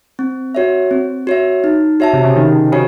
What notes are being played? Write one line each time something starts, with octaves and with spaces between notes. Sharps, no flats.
C4
F#4 C#5 E5
C4
F#4 C#5 E5
D#4
F#4 C#5 E5 A5
C3
C#3
D#3 D#4
C#3 F#4 C#5